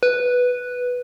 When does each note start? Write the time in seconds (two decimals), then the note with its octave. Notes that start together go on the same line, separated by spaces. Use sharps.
0.03 B4